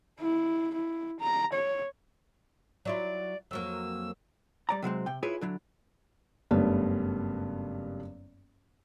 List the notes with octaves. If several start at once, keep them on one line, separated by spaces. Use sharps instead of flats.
E4
E4
A#5
C#5
F#3 E4 F4 D5
F2 F#3 A#3 E6
G3 D5 A#5
C3 F#3 G#3 C4
C3 G5
E4 F4 G#4 B4 C#5 E5
D3 F#3 E4
F#1 G2 A3 B3